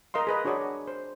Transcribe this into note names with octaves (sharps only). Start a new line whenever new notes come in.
A#4 D#5 F5 C6
G#4 B4 D#5
D4 F#4 G#4 C#5 D5
C5